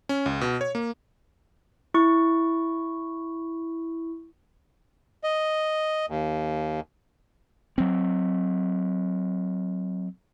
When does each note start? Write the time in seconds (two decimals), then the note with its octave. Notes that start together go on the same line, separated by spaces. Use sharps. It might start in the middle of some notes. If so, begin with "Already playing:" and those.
0.09 C#4
0.26 C#2
0.41 B2
0.61 C#5
0.75 A#3
1.94 E4 C#6
5.24 D#5
6.09 D#2
7.78 F#3 C4